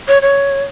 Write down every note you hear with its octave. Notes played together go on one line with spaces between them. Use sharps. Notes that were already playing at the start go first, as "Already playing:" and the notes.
C#5
C#5